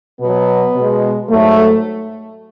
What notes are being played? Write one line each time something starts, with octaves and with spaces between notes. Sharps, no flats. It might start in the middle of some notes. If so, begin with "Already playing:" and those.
B2 F#3 B3
B2 G#3
G#2 F#3 A3